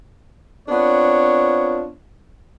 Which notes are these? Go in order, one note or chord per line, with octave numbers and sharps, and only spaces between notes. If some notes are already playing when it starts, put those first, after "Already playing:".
B3 C4 D4 F4 C#5